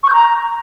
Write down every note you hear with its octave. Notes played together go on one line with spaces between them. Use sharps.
C#6
G6
A#5